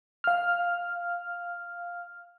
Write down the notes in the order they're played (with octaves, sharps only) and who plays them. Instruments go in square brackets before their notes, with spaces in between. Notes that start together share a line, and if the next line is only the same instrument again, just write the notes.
[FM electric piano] F5 F6